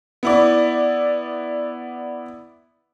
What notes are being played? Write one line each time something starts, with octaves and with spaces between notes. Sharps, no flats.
B3 E4 D5